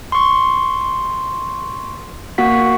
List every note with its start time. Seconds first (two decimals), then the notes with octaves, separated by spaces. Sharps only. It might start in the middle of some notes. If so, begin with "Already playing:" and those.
0.12 C6 C#6
2.38 A#3 F#4 F#5 B6